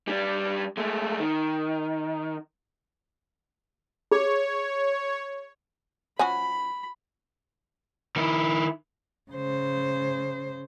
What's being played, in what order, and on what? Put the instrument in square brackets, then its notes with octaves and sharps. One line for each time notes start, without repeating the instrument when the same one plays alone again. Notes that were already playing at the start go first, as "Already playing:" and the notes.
[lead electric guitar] G3 D4
G#3 A3
D#3
[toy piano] G#4 [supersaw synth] C#5
[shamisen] F3 C#4 F#4 [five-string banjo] G#5 [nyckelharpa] B5
[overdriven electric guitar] D#3 E4
[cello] C#3 C5